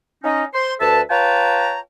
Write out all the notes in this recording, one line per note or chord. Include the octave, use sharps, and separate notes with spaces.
C#4 D#4
C5 C6
D2 A4 B4 E5 A5
F4 B4 C#5 G5 A5 A#5